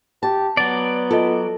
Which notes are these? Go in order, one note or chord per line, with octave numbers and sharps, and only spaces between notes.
G4 A5
F#3 B3 D5 A6
F4 A4 D#5